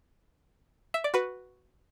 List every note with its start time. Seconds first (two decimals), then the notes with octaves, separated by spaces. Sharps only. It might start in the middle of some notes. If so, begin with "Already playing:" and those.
0.94 E5
1.04 D5
1.14 F#4 B4